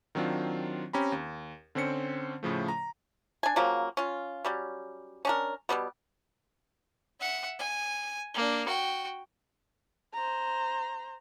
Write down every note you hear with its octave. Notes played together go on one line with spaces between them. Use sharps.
D#3 F#3 C4 D4 F4
C4 C#4 G4 A#5 B5
D#2
D3 C4 C#4 C5 C#7
A2 C#3 F3 A3
A#5
D4 G#5
C#3 F3 F#3 A#3
C#4 F4
F#3 G3 C#4
C#4 D4 A#4
B2 E3 G3 B3
E5 F#5
G#5
A#3 D4
F#4 G5
C5 A#5